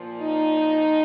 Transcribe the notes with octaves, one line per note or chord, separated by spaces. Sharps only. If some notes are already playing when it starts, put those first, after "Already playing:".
Already playing: A#2 F3
D#4